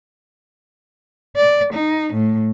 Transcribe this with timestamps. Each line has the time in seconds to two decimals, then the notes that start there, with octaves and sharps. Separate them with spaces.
1.36 D5
1.73 D#4
2.14 A2